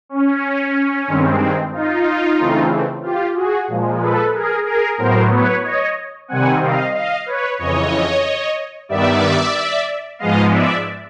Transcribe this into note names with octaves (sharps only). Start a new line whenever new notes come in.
C#4
G2 D#3 G#3 C4
D#4 F4
C#3 E3 A3 C4
F4 G4
F#4 G#4
A#2 F3 G#3
A4 B4
G#4 A#4
G#4 A#4
A2 F#3 B3 A#4 C5
B4 C#5
C#5 D#5
C3 D#3 G3 C4 F#5 G#5
D#5 F5
D#5 F5
B4 C#5
F2 C#3 E3 C#5 D#5
G2 D#3 G3 B3 D5 E5
G#2 F3 G#3 B3 D#5 F5
D5 E5